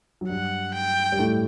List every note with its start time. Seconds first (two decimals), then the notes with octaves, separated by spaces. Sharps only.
0.21 F#3
0.29 G2 G3 F#5
0.74 G5
1.12 G3
1.19 A2 A3